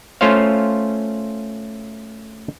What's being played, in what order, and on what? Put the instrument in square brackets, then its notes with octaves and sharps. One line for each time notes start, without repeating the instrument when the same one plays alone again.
[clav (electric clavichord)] A3 C#4 F4 C5 C#5 F5